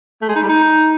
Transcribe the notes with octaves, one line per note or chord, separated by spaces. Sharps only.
A3
G#3
D#4
G3
D#4